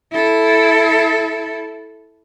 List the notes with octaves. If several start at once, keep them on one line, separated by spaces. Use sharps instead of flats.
E4 A4